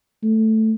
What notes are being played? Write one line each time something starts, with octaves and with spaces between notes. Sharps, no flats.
A3